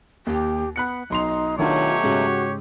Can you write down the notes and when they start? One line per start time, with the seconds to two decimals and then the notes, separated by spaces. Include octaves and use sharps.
0.27 D#2 G4
0.76 B3 B5 F#6 C#7
1.10 B1 D#4 C6 F7
1.59 B2 D#3 F#3 A3 D4 F4 G4 C#5
2.04 G#2 C#3 F#4